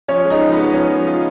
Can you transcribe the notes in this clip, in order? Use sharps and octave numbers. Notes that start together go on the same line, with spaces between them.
F3 C#4 C#5
G#3
D#4 D#5
F3
B3 B4
G#3
F3 C#4 C#5
F3
G#3 F4